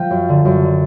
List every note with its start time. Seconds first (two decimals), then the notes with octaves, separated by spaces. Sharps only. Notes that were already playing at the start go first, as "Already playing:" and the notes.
Already playing: F3 G5
0.10 F#2
0.29 D3
0.45 F#2
0.63 D3